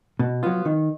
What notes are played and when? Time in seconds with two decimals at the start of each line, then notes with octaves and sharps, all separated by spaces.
0.19 B2
0.43 F#3 B3 F4
0.65 D#3